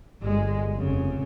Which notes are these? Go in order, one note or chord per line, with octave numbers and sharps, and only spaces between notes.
G1 G#3
F1 C#3